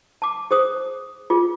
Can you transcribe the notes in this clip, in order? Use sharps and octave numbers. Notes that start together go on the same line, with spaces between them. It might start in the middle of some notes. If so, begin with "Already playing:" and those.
A5 D6
G#4 C5 D#6
F4 G#4